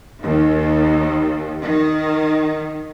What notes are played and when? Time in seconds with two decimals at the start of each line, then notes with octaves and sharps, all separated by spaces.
0.23 D#2
1.64 D#3